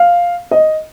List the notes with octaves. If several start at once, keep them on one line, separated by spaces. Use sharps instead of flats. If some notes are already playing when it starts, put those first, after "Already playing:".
Already playing: F5
D#5